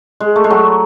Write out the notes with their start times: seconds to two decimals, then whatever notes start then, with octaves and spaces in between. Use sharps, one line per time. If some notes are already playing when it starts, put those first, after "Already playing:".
0.20 G#3
0.36 A3
0.44 G#3
0.50 F#3